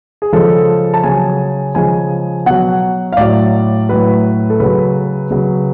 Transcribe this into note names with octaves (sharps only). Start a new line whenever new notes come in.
G#4
C#3 F3 G#3 A4
A5
C#3 F#3 G#5
C#3 F3 G#3 G#5
B2 F#3 F#5
F5
A2 F#3 D5
A2 F#3 B4
A4
C#3 F#3 B4
C#3 F#3